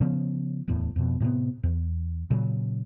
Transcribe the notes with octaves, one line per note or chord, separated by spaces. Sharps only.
C#3 F3 B3 C#4
D1 E2 A2
F2 B2
A2 C3 A#3 B3
E2
A#2 C#3 F#3